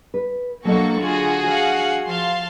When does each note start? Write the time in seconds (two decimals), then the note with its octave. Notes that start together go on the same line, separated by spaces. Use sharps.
0.14 B4
0.65 B2 F#3 A#3 D4 F#4 A4 D#5 C#6
1.01 D3 F4 F#4 G#4
1.48 F5 F#5
2.05 F3 F5 A5 C6